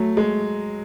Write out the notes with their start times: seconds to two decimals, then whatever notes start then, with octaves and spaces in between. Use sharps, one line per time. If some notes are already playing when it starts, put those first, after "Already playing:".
Already playing: F#3 A3
0.17 G#3